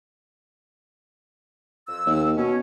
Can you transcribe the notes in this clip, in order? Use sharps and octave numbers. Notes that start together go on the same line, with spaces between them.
F2 E6
D#2
B2 C#4